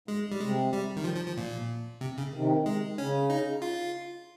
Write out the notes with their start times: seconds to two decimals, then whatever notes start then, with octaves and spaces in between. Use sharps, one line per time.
0.08 G#2 G#3
0.30 G#2 G3
0.40 C3 G#3
0.73 G3
0.96 D#3
1.04 F3
1.15 F3
1.27 F3
1.37 A#2
2.01 C3
2.18 C#3
2.33 C3 D#3
2.66 G#3
2.98 C#3 C#4
3.30 D#4
3.62 F4